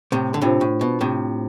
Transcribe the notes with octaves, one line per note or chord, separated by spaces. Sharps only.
A2 C3
D3
A2 C3 D4 F4 C5
A2
B2
A2 C3